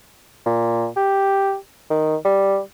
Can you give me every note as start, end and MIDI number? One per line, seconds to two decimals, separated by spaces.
0.46 0.86 46
0.97 1.55 67
1.90 2.16 51
2.25 2.59 55